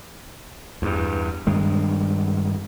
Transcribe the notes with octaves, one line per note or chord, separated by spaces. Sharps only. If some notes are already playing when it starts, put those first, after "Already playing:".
E2 G2
G2 D#3 G#3